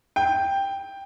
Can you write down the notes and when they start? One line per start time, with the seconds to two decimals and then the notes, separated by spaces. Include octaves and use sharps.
0.16 G5